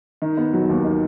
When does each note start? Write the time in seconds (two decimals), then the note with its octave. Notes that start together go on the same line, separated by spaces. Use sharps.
0.22 D#3
0.37 B3
0.53 F#3
0.69 D#2
0.84 D#3